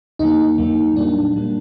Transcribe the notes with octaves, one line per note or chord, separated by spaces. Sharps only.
F2 D3 F#3 A#3 D#4
F2 D3 F#3 A#3
A#2 G3 A#3 D4
A#2 G3 A#3